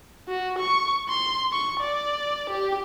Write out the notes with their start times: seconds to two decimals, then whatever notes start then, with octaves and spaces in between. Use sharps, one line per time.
0.28 F#4
0.59 C#6
1.10 C6
1.52 C#6
1.81 D5
2.50 G4